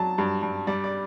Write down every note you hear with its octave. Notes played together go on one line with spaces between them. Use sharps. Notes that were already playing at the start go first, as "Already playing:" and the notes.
Already playing: F#3 A5
G2
G2
G3 D5
D5